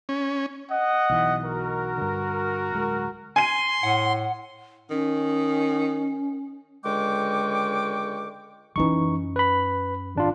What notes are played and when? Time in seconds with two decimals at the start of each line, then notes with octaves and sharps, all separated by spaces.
0.09 C#4
0.70 D#5 F#5
1.09 B1 E3
1.44 F#4 A#4
1.98 G2 D3
2.72 D1 G#3
3.36 G#5 C6 D#7
3.83 A2 F#5
4.90 D#3 C#4
6.85 C#2 D3 G#3 G5 C#6 D6
8.76 F#2 E3 C#4 D#4 C#6
9.36 B4 B5
10.15 G#1 D4 F4